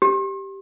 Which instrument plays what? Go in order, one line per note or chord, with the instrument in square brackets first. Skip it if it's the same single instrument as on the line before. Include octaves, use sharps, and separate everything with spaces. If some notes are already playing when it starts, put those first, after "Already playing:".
[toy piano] G4